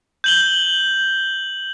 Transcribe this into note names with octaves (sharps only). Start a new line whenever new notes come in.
G6 F#7 G7